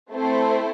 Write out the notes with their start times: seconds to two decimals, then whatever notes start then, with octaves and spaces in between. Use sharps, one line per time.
0.11 A3 C4 E4 A4 C5